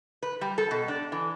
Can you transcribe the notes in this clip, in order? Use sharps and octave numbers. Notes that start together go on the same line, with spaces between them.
B4
G3
A4
B2
D4
E3